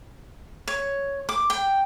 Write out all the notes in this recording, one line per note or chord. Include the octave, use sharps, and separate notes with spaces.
C#5
D6
G5